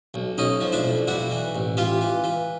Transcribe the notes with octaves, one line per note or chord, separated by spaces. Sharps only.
B1
B1 C#4 D#4
F3
D4 E4
B1
G3 E4 F#4
E3
A1
E3 F4 G4
E3
E3